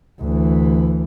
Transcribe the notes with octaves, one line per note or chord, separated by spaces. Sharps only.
D2 E3